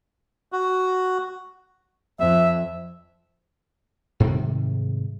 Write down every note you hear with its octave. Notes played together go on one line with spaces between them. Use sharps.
F#4
F2 E5
G#2 C3 D#3 G3